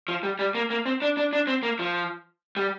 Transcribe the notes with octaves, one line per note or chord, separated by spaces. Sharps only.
F3
G3
G3
A#3
A#3
C4
D4
D4
D4
C4
A#3
F3
G3